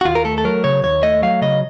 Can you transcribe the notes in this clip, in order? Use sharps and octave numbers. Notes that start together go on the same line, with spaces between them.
F#4
D#2 F4
A#4
A3 A4
A4
F#3 A#4
C#3 C#5
D#2 C#5
A3 D#5
F#3 F5
C#3 D#5